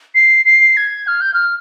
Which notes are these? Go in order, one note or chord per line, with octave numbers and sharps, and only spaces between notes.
C7
C7
G#6
F6
G6
F6